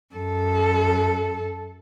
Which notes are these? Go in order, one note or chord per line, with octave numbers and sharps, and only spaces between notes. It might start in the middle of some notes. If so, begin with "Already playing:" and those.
F#2 A4